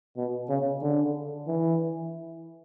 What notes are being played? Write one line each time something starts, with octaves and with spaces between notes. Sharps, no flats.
B2
C#3
D3
E3